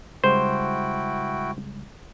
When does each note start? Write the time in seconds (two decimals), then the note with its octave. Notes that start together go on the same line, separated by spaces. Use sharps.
0.24 C#3 G3 G#3 E4 F#4 C5 G5